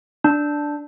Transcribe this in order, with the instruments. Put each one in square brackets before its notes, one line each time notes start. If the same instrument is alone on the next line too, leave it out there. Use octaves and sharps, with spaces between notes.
[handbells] D4